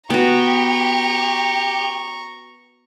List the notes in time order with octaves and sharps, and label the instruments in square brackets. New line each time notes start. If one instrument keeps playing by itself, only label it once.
[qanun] B3 F#4 [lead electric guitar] G4 [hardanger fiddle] A#5 C#6